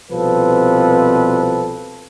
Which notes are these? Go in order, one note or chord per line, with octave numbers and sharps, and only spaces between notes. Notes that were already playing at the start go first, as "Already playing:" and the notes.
C2 B2 F3 C4 A4 B4